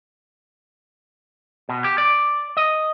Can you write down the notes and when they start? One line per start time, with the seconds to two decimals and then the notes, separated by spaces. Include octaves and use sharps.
1.69 B2
1.84 G4
1.98 D5
2.57 D#5